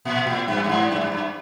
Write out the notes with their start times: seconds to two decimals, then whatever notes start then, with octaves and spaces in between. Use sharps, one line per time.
0.05 A#2
0.27 A2
0.48 G2
0.64 G2
0.69 G#2
0.91 G2
1.01 G2
1.12 G2